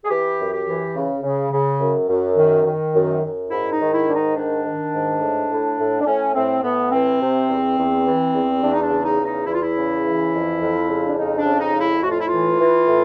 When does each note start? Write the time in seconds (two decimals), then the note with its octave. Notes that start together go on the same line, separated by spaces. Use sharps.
0.05 G#4
0.10 E3 G4
0.39 F#2
0.53 G4
0.67 E3
0.96 C#3
1.23 C#3
1.52 C#3
1.80 F#2
2.09 F#2
2.37 D#3
2.66 D#3
2.94 F#2
3.23 F#2
3.50 G#2 E4
3.72 D#4
3.79 D#3
3.94 E4
4.08 G#2 D4
4.15 D#4
4.35 D#3 D4
4.64 D#3
4.93 G#2
5.21 A2
5.50 A2
5.78 A2
6.01 D4
6.06 A2 C#4
6.34 A2 C4
6.63 A2 B3
6.91 E3 C4
7.20 C3
7.48 E2
7.77 E2
8.05 E3
8.33 E2
8.62 E2 D4
8.73 D#4
8.83 D4
8.90 C#3
9.04 D#4
9.19 E2
9.26 D#4
9.46 E2 E4
9.54 F4
9.62 E4
9.76 C#3
10.04 E3
10.32 F2
10.60 F2
10.89 C#3
11.06 D4
11.17 F2 D#4
11.38 D4
11.46 C#3
11.60 D#4
11.74 F2
11.81 E4
12.02 A2 F#4
12.11 F4
12.19 E4
12.28 E3 F4
12.59 E3
12.87 A2